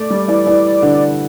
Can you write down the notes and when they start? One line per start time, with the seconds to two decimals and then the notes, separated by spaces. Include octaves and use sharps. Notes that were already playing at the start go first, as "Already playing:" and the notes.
Already playing: A3 D5
0.10 G3
0.28 E3
0.47 E3
0.82 D3